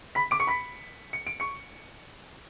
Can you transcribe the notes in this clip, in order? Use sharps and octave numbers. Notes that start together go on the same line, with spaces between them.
B5 B6
D6 D7
C#6 C#7
B5 B6
C#7
D7
C#6 C#7